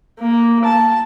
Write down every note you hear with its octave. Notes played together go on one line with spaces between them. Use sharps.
A#3
A5